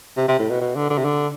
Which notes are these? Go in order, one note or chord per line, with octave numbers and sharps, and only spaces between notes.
C3
C3
A2
B2
B2
D3
D3
C3
D3